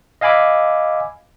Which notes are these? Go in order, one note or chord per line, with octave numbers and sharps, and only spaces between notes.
D#5 F5 G#5 B5 D6 E6